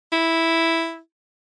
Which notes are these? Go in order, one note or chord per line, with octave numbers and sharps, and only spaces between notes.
E4